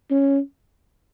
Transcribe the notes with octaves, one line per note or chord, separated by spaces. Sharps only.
C#4